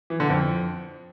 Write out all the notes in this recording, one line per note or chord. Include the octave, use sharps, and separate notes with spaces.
E3
D3
F2